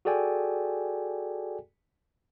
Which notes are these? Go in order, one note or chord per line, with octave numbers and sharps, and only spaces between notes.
F#4 G#4 A4 D5 G5 G#5